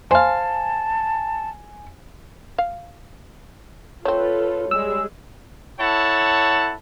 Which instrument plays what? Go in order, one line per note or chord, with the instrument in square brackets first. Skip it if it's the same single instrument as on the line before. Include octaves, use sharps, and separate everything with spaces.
[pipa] C5 F5 [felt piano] G#5 [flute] A5
[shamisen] F5
[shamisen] A3 C4 [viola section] F4 A4 B4 [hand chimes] C#5
[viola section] G3 G#3 G#4 [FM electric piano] E6
[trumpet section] E4 A4 C#5 F#5 A5